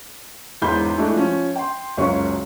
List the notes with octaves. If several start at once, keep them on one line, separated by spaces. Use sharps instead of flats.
E1 E2 G#2 B5 C6 G6
G#3 A3 D4 E4 F#4
F3 C#4
G5 C6
F#1 C#2 F#3 C#5 C#6